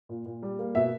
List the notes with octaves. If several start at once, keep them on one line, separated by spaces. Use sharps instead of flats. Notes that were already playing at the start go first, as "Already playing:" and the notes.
A#2
A#2
G3
A#3
B2 E5